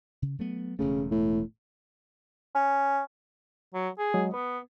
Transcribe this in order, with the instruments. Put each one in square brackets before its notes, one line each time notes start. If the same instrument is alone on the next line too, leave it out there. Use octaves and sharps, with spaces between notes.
[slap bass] C#3
F#3 A3 B3
[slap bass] E1 A3 [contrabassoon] C#3
[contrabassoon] A2
[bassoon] C#4
[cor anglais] F#3
G#4
[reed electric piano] F#3 G#3 D#5
[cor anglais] B3 [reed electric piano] B4